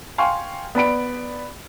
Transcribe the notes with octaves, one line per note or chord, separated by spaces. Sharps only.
F5 G5 G#5 C6 C#6
B3 D5 B5 D7